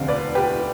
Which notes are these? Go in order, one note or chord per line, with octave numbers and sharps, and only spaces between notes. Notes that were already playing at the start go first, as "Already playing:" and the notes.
Already playing: E1 D2 C3 F3 F5
B4 D5
G4 B4